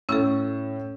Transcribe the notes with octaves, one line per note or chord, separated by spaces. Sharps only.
A2 C#4 A4 E6